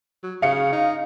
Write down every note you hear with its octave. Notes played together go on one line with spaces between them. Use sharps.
F#3
C#3 F5 C#7
D#4